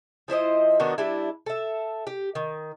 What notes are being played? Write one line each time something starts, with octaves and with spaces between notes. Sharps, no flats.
F3 E4 C5 D#5
D#3 B3 D4 F#4
G3 D4 E4
A4 E5
G4
D#3